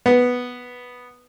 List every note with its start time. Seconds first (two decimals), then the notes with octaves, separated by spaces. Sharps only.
0.06 B3